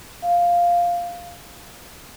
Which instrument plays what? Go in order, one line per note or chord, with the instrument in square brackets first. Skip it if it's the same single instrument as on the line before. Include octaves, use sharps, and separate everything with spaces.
[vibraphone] F5